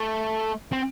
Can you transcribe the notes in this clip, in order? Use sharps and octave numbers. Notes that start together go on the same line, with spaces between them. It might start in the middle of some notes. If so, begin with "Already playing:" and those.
Already playing: A3
C4